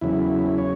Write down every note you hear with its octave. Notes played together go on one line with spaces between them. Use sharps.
E2 C#3 F#3 E4
C#5